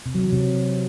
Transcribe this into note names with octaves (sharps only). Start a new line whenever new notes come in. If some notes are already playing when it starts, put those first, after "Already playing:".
C3
F#3
E3
C3